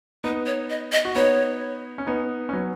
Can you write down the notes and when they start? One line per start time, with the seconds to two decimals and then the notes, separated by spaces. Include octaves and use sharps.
0.24 B3 D#4 B4
0.46 C#5
0.70 D#5
0.92 D#5
1.05 F#4
1.15 B3 D#4 C#5
1.98 C#4
2.07 B3 D#4
2.49 C#4
2.53 F#3 B3